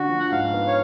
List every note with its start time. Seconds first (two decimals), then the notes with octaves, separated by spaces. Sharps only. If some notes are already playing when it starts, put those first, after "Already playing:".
Already playing: D3 D4 F#4
0.09 F3
0.19 F#5
0.31 G#2 F5
0.54 B3
0.67 C#5